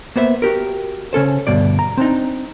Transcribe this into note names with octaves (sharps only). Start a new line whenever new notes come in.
A#3 B3 C5 E5
F#4 G4 A#4
C#3 C#4 A4 C5
D2 G2 B2 D5
A#5
C4 D4 D#4